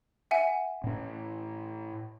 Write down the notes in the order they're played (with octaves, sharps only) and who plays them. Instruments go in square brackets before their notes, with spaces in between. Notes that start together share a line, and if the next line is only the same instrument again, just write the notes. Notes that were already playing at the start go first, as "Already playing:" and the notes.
[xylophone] E5 F#5 G#5
[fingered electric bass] A2 C#4